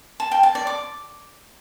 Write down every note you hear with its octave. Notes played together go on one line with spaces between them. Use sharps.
A5
G5
A5
D5
D6